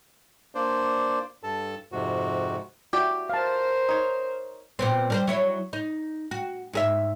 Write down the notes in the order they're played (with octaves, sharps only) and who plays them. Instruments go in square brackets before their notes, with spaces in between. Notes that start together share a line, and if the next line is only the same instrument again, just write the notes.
[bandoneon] A#3 D4 C5 D5
G2 A4 A5
F2 G#2 C3 F#4
[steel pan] E4 F#4 [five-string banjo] G4 D5 G5
[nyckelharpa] A#4 C5 [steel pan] F5 A5
[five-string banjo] D#4 C#5
[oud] A#2 B3 C4
G3 A#4 C5
F#3 E4 C#5
D#4
F#4
G#2 G#4 E5